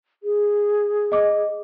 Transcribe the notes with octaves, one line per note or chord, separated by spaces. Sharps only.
G#4
D#5 D6